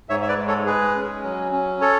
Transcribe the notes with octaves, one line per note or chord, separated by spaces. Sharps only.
G#2 C#5 E5
E5
B4 D5
G#3
A4 C#5
G#3 G#4 B4
C#4
F#3
C#4
A4 C#5